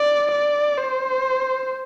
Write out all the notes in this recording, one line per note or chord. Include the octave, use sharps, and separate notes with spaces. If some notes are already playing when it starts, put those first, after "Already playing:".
Already playing: D5
D5
C5